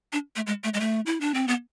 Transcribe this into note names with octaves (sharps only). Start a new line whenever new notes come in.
D4
A3
G#3
A3
G#3
A3
E4
D4
C4
B3